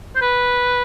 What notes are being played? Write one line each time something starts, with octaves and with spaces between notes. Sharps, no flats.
C5
B4